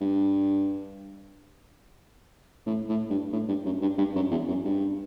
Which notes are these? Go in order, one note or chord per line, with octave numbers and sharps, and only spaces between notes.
G2
A2
A2
G2
A2
G2
F#2
G2
G2
F#2
E2
F#2
G2